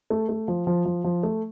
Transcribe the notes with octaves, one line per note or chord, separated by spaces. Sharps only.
A3
A3
F3
F3
F3
F3
A3